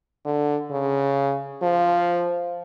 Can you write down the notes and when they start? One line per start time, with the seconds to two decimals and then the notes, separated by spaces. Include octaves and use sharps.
0.25 D3
0.71 C#3
1.62 F3